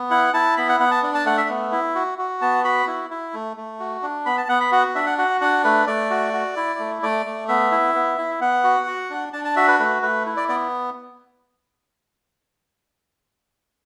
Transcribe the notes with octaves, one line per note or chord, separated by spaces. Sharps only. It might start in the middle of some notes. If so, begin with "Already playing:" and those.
Already playing: B3
E4 F#5
E4 A5
B3 B5
F#5
B3 F#5
A5
D4
A5
A3 F#5
E5
B3
E4
F#4
F#4
B3 A5
F#4 B5
E4
E4
A3
A3
F#4
D4
B3 B5
A5
B3 F#5
B5
F#4 F#5
D4 E5
F#5
F#4 F#5
D4 F#5
A3 B4
A3 D5
F#4
F#4
E4
A3
A3 D5
A3
B3 E5
E4
B3
E4
B3 F#5
F#4
F#4
D4
D4 A5
A5
F#4 E5
B4
A3 B4
A3 B4
E4
D5
B3 D5